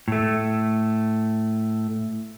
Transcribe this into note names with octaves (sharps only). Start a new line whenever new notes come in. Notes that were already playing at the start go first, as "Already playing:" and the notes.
A2 A3